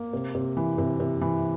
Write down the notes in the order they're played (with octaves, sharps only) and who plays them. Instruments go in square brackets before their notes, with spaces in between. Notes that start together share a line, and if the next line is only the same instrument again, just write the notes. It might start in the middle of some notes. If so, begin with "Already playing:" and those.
Already playing: [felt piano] A#3
C3
C3
E3
C3
C3
E3